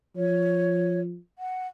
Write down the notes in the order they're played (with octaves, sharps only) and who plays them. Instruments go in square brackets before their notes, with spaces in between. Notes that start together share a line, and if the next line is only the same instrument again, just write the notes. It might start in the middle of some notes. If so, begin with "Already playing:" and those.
[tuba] F3 [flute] C#5
[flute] F#5